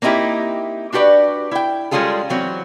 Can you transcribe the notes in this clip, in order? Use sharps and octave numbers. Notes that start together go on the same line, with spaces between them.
A#3 C4 D#4 E4 G4
D4 F#4 G4 B4 D5
E4 G5
G3 G#3 C#4 F4 G#4 A4
E3 F#3 C4